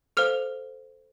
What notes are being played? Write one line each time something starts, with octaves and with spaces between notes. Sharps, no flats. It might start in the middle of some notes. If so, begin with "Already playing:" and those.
A4 C5 F5 F6